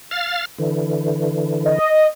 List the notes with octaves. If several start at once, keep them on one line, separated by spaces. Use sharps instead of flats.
F5 F6 A6
D3 E3
D#5